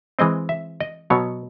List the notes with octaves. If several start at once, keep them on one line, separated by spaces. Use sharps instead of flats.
E3 G#3 C4 D#5
E5
D#5
B2 F#3 B3 C#5